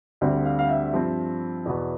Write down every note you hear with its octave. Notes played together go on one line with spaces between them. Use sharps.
D2 D3 G3 C4
F5
F5
E5
G2 F3 C4
E2 B2 B3